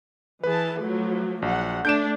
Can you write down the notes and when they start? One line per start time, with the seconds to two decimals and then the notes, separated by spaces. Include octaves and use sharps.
0.43 E3 G#4 B4 A5
0.80 F3 F#3 A3
1.42 A#1 F#3 F#5
1.85 A3 D4 G6 D7 E7